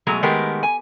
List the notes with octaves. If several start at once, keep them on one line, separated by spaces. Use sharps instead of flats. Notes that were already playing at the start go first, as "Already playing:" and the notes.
B2 F#3 G#3 A3 G#4 A#5
D#3 G#3 A3 B3 G4 A#4
G#5